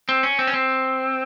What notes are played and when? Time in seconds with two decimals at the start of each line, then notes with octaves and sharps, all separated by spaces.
0.09 C4
0.23 C#4
0.39 C4
0.47 C#4
0.54 C4